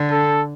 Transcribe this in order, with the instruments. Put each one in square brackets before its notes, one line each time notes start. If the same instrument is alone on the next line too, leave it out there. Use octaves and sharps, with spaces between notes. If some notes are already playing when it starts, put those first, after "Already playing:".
Already playing: [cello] D3
[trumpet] A4